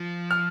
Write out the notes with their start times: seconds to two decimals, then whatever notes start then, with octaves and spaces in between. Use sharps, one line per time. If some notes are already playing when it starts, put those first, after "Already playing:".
Already playing: F3
0.31 F6